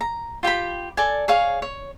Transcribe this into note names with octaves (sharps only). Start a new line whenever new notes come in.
A#5
F4 G4 G5 B5
A4 D5 G#5
G#4 C#5 F5
C#5